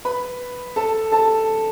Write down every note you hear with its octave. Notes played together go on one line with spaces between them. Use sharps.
B4 B5
A4 A5
A4 A5